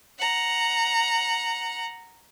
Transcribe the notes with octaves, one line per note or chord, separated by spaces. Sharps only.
F#5 A#5